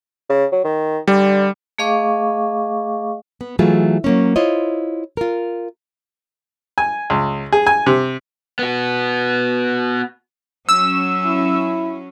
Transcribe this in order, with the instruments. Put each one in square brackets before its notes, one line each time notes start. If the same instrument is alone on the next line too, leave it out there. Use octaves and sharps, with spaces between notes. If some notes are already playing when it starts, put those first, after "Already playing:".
[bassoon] C#3
F#3
D#3
[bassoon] D3 [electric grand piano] G3
[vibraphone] A3 G#4 D#5 F5 C#6 D6
[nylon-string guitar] B3
E3 F#3 A3 F4 G#4
F#3 A#3 C#4
E4 F4 C5 C#5 D#5
F4 A#4
[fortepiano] G#5
C#2
G#4
G#5
C3
[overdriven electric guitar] B3 F#4
[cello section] F#3 C#4 [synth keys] E6
[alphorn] E4